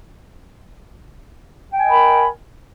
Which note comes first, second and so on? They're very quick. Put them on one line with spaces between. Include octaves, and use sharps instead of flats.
G5 G#5 D#5 A#4 B5